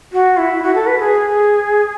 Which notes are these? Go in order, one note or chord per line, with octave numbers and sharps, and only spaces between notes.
F#4
E4
F#4
A4
B4
G#4